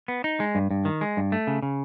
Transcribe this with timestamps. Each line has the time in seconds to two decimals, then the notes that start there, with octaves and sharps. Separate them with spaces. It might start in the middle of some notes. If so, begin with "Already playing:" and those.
0.08 B3
0.24 D#4
0.40 G#3
0.55 G2
0.71 G2
0.85 D#3
1.01 G#3
1.17 G2
1.32 A3
1.47 C#3
1.62 C#3